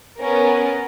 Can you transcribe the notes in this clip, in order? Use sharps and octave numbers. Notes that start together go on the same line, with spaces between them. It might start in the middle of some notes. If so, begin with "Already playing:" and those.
B3 C#4 A#4